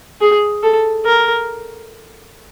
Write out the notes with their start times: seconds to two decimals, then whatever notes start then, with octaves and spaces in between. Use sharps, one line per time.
0.21 G#4
0.63 A4
1.05 A#4